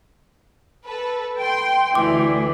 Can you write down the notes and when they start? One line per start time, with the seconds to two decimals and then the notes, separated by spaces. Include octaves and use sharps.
0.86 A4 B4
1.39 G5 C6
1.95 D2 E3 D6